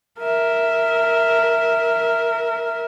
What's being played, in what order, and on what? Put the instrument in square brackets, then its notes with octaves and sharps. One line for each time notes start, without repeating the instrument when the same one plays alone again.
[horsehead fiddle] A#4 E5